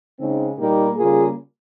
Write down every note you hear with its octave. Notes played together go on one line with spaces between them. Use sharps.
C#3 G#3 C4 D#4
A#2 G3 A#3 D#4 G4
C#3 G3 A#3 F4 G#4